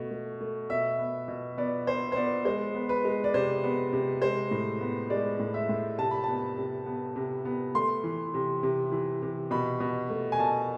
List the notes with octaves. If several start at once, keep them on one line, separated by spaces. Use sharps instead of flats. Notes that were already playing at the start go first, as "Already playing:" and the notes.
Already playing: B2 A3
A3
A3
B2 E5
B3
B2
B3 D5
B3 C5
C5
B3 D5
G#3 C5
B3
B4
G#3
D5
C3 C5
B3
C3
G#3 C5
A2
B3
G#3 D5
A2
E5
A2
C3 A5
B5
B3 A5
C3
B3
C3
B3
A3 C6
E3
C3
C3
E3
C3
B2 B5
B2
A3
G#5
B2 A5